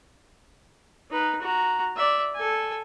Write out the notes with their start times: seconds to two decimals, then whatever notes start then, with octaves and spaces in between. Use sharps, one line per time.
1.10 D#4 B4
1.41 F#4 A#5
1.96 D5 E5
2.35 A4 G#5